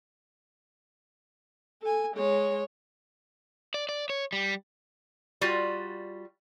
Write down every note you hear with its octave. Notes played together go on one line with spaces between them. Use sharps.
A4 G#5
G#3 C#5
D5
D5
C#5
G3
G3 F4 F#4